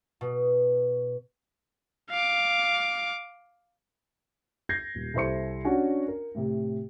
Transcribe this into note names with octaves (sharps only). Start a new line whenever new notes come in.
B2
F5 D6
G6 G#6 A#6 C7
D#1
C2 E4 A4 C5 C6 C#7
C#4 D4 F#4 F#5 G#5
A#4
A2 C3